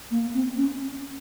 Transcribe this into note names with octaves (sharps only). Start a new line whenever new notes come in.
A#3
C4
C#4